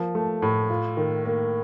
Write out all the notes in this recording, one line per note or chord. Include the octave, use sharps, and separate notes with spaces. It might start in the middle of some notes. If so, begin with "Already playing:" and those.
Already playing: F3 A#3
A3
A2
F4
D#3
A#3